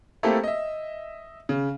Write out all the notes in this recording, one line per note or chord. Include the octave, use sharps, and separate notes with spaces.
A3 A#3 C4 E4 G4 A4
D#5 E5
C#3